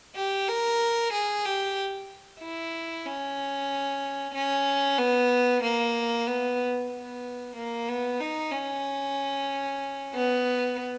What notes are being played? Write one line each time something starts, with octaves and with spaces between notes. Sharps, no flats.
G4
A#4
G#4
G4
E4
C#4
C#4
B3
A#3
B3
B3
A#3
B3
D#4
C#4
B3